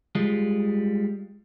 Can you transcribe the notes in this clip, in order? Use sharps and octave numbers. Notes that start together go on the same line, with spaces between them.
G3 G#3 F4